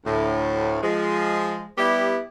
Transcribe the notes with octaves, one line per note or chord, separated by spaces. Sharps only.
D2 A2
F3 G#3
G3 B3 E4 G4